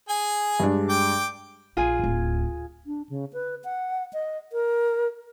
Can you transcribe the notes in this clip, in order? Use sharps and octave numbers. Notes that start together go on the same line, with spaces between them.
G#4 G#5
G2 G#3 D4
G5 D6
A#1 F4 G#4 G#5
D1 G1
D4
C#3
B4
F#5
D#5
A#4